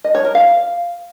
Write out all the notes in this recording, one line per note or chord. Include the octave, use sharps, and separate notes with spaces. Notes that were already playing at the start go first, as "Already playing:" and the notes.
D#5
C#5
A#4
F5